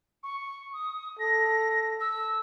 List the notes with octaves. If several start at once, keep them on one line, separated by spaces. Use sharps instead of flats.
C#6
D#6
A4 A#6
E6